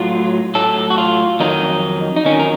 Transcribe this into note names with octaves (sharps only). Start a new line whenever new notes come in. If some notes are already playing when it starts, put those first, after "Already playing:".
Already playing: A2 F#3 F4
A2 F#3 A4
F#4
F4
F2 D#3 F#3 D#4
D#4
F2 D#3 F#3 C#4
A#4